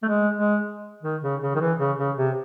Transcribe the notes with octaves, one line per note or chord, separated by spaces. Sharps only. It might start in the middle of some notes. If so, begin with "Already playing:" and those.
A3
G#3
G#3
D#3
C#3
C#3
D#3
E3
C#3
C#3
C3